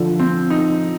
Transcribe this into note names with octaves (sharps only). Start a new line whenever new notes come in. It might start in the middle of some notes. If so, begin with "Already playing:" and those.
Already playing: D3 F3
C4
D#4